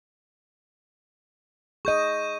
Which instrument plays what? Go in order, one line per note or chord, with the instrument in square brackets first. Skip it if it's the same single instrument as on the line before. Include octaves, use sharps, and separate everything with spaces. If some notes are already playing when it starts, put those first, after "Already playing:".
[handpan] G#4 D#5 [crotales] C#6 G6 D#7